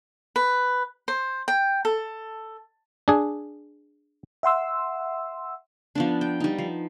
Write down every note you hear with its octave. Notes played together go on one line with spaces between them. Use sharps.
B4
C5
G5
A4
D4 G#4
E5 F#5 C6 E6
F3 B3 D4
G5
G3 D#4
F3